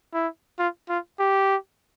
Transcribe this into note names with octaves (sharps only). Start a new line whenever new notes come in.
E4
F4
F4
G4